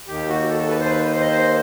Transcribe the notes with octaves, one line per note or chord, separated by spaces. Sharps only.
D#2 D#3 G4
F#4
A4
A4
B4
C5
B4
C5
D#5
C5